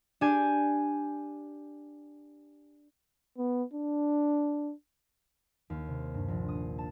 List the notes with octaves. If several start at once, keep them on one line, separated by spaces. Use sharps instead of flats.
D4 G4 G#5
B3
D4
D#2
C3
G2
A#1
D#6
A5